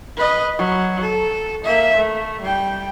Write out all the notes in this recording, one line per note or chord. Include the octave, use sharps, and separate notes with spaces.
B4 D#5
F#3
A4
A#3 E5
A3
G3 G5